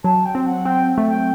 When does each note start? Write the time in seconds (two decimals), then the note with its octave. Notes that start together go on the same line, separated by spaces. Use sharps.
0.04 F#3 A5
0.25 G5
0.35 C4
0.46 F#5
0.65 C4 G5
0.98 A3
1.08 G5